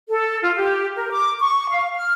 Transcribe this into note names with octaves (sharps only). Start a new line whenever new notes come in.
A4
F4
G4
A#4
D6
C#6
F5
F6